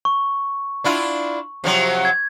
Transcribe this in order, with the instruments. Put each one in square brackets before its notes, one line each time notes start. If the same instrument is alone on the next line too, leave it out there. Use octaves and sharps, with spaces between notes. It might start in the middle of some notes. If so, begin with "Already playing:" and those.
[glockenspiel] C#6
[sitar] D4 E4 F4
C3 F3 F#3
[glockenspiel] G#6